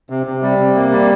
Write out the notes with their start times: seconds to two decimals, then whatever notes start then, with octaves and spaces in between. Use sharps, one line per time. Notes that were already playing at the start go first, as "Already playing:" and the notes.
0.10 C3
0.26 C3
0.42 G3
0.58 C3
0.75 A#3
0.92 G3